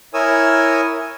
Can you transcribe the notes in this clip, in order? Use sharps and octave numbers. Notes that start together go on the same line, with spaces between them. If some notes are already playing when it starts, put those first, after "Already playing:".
E4 A#4 C#5 G#5 D#6 E6